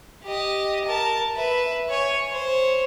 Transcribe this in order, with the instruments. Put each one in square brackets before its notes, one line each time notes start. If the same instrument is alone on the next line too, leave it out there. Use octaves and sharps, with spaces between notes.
[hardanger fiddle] G4 D#5
A#4 A5
B4 E5
C#5 G#5
C5 C#5